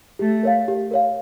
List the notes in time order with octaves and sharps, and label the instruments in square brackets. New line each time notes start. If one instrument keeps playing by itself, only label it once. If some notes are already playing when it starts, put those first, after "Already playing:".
[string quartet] A3 [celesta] G4
[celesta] A#4 C#5 F5
G4
A#4 C#5 F5